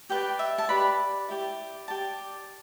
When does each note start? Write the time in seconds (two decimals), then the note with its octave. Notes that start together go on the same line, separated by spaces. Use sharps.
0.10 G4 B4 D5 G5
0.39 E5
0.58 A5
0.69 G4 B4 D5 B5
1.28 E4 G4 D5
1.88 G4 D5 A5